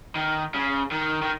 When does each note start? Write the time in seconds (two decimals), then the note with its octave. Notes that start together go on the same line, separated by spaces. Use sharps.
0.15 D#3
0.54 C#3
0.92 D#3
1.23 D#3